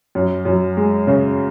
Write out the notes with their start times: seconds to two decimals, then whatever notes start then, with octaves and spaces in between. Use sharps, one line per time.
0.15 F#2
0.45 F#2
0.77 G#3
1.07 C#3